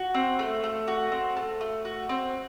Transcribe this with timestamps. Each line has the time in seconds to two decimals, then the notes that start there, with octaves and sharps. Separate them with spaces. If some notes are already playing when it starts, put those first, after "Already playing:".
Already playing: F#4
0.14 C4
0.39 A3
0.64 A3
0.88 F#4
1.12 C4
1.36 A3
1.61 A3
1.85 F#4
2.09 C4